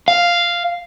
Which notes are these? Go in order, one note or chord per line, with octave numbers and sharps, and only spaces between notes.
F5